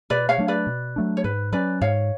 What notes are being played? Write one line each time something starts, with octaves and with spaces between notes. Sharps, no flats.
B2 B4 D5
C#5 F5
F#3 A3 D4
B4 D5
B2
F#3 A3 D4
C#5
G#2 B4
F#3 C#4 B4 D5
G#2 C#5 F5